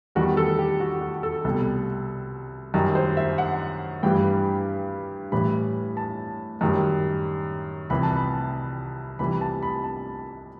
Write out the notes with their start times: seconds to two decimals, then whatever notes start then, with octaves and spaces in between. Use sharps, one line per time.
0.15 E2 D#3 G3 F#4
0.37 A4
0.59 G4
0.80 F#4
1.01 F#4
1.23 A4
1.44 C2 B2 G3 A4
2.74 F#2 D#3 G3
2.95 C5
3.17 E5
3.38 F#5
4.03 G2 E3 G3 G5
5.32 A2 E3 G3 B5
5.97 A5
6.61 F#2 D#3 G3
7.90 C2 C3 E3 B5
8.03 A5
8.16 B5
9.19 C2 C3 E3 G3 B5
9.41 A5
9.63 B5
9.84 A5